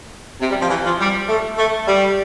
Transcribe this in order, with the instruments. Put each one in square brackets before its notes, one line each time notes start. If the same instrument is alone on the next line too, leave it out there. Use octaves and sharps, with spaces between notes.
[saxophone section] C3
G3
F3
E3
F3
G3
A3
A3
G3